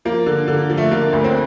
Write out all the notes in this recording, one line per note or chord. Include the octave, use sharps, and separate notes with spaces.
F3 A#3
D3
D3
F3
A3
D3 A#3
D2
C4